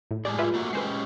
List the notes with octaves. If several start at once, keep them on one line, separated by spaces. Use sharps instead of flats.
A2
G#3 G4 G#4 D5 A5
F4 B4 E5
A3 A#3 F#4
G#3 C#4 G4 B4 C5 C7